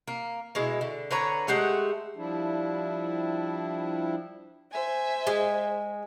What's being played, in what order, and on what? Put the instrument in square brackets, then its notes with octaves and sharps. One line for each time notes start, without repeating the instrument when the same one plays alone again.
[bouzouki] A#3
B2 G#3 E4
D3
D3 B4 C#5 A#5
G#3 A3 G4 F#5
[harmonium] F3 G3 D4 E4
[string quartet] C5 E5 G#5
[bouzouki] G#3